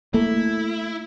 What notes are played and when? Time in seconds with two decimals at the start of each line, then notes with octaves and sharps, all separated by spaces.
0.14 A3 A#3 E4